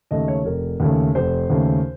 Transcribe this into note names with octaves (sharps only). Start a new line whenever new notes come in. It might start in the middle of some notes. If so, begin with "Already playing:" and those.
D#2 C#3 A3 D#5
C#5
F1 A#4
D#2 C#3 A3
F1 C5
D#2 C#3 A3